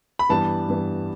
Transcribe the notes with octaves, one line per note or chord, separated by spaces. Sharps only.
B5
G2 E3 G3 B3 A5
G2 E3 G3 B3